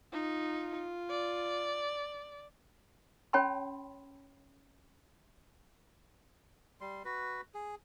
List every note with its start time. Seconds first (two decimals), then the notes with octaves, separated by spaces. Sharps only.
0.13 D#4 F4
1.10 D5
3.33 C#4 C#5 G5 A5 B5 C6
6.81 G3 C6
7.05 F#4 B4
7.54 G#4